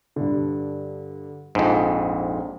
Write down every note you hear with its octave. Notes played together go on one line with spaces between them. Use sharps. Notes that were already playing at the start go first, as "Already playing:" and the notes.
G2 D3
A#1 F2 G#2